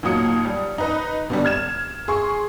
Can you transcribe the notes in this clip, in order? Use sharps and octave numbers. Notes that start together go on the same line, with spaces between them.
D#2 A#2 F#3 D#6 C#7
G3
D#4 B4 D#5
B2 D3 G3
F6 G#6 E7
G#4 C6 C#6